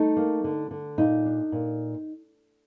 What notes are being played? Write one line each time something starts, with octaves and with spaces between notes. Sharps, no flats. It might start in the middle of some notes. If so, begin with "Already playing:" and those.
Already playing: A3 D#4
A#3
D3
D3
A#2 D#4
D4
A#2